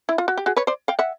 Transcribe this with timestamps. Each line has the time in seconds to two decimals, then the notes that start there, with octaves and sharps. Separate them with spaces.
0.09 E4
0.18 F4
0.28 F#4
0.37 G4
0.46 F#4 G#4
0.56 B4 C#5
0.67 C5 D5
0.88 F5 G5
0.99 E5 F#5